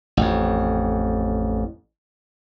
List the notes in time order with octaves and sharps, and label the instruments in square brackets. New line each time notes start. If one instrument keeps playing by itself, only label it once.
[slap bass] A1 F2